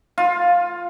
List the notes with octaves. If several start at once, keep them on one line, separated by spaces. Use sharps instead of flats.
F4